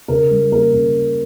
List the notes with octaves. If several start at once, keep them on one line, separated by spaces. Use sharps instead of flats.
C#3 A#4
G3
A#3 A#4
C#3